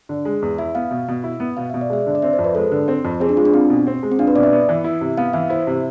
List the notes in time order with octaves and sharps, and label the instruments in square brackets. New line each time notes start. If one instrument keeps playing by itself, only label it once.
[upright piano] D3
G#3
E2
[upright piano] E4 [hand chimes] E5
[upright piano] B3 [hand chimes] F5
[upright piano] B2
B2
E4
B3
[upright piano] B2 [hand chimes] F5
[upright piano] B2 [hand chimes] E5
[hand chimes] D5
[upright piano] G#3 [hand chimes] E5
[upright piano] D3
[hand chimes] D5
[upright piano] C4 [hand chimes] E5
[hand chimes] C5
[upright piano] F2
[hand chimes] B4
[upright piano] G#3 [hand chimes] A4
[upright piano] D3
C4
F2
[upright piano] C4 [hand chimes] G#4
[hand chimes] D4
[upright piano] G#3 [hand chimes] F4
[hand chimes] D4
[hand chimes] C4 [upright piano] F4
[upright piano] B2
C4
G#3
[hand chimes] C4
[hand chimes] D4 [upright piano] F4
[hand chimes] B4
[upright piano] B2 [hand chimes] D5
[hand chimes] E5
[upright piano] B3
E3
E4
C3
[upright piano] B3 [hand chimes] F5
[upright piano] E3 [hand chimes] E5
[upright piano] E4 [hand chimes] C5
[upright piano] C3